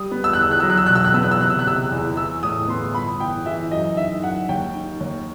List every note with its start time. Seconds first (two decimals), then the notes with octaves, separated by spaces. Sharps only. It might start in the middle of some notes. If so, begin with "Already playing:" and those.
Already playing: G3 D#6
0.11 B3
0.24 E6
0.33 E2 F#6
0.42 E6
0.51 F#6
0.60 F#3 E6
0.70 F#6
0.77 E6
0.86 B2 F#6
0.95 E6
1.05 F#6
1.14 B3 E6
1.23 F#6
1.31 E6
1.40 C3 F#6
1.50 E6
1.59 F#6
1.65 C3 E6
1.91 E2
2.17 E3 E6
2.43 A2 D#6
2.68 B3 C6
2.95 G1 B5
3.20 E3 G5
3.46 E3 E5
3.71 F#2 D#5
3.97 D#3 E5
4.23 F#2 F#5
4.49 D#2 G5
4.75 D#3
5.00 D#2